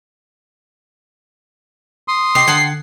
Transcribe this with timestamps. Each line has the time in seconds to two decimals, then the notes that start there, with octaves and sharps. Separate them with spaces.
2.08 C6 D#6
2.35 C3 G4 D#5 C7
2.48 D3 F#5 G5 A5 G#6 C#7